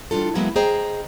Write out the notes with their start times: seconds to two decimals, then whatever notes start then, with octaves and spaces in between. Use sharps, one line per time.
0.11 E3 G3 D4 F4 A4
0.35 E3 F#3 G#3 A#3 B3 E4
0.56 G#4 C5 D#5 G5 A#5